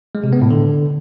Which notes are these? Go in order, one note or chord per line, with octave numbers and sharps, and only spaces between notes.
G#3
C3
B3
A2
D3